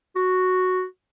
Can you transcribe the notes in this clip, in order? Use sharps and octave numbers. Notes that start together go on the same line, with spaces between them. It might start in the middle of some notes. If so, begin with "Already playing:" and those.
F#4